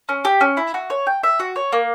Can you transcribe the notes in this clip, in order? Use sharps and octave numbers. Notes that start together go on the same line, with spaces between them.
C#4
G4
C#4
E4
F#4
C#5
G5
E5
F#4
C#5
A#3